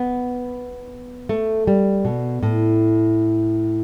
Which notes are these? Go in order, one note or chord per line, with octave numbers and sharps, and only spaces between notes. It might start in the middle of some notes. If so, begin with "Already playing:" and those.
Already playing: B3
A3
G3
B2
A2